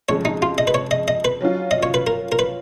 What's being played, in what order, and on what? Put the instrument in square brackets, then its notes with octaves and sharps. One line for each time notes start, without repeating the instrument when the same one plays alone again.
[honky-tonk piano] F2 C#3 F3 G#3 [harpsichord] C#5
[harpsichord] D#4
F4
D#5
B4
C#5
D#5
D#5
B4
[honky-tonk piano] F#3 C#4 F4
[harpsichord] D#5
C#5
B4
A#4
A#4
B4